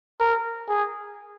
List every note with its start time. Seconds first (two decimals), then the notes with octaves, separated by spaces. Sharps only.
0.20 A#4
0.69 G#4